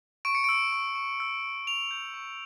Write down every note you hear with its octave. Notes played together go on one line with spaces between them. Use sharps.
C#6 D7
C#7
E6 D7
C#6
C#6
E6
C#6
C#6 F7
G6
C#6